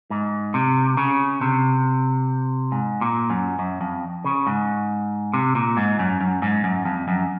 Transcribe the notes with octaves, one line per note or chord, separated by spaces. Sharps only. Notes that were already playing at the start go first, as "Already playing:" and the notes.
G#2
C3
C#3
C3
G#2
A#2
F#2
F#2
F2
C#3
G#2
C3
A#2
G#2
F#2
F#2
G#2
F#2
F2
F#2